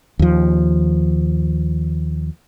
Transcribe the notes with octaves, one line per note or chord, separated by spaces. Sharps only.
D#2 F3